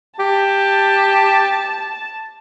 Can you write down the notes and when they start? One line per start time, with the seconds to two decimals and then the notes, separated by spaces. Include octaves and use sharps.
0.19 G4 A5